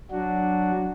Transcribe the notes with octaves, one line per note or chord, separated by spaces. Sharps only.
F#3 D4 F#4